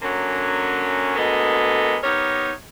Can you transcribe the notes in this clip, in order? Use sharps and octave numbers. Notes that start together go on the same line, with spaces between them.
D3 F#3 A#3 C#4
D2 G#3 A#3 B3 A4 D#5
B3 D#4 G4 A#4 C#5